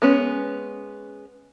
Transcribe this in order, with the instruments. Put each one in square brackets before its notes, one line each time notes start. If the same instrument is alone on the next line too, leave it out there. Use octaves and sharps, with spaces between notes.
[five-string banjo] G#3 B3 C#4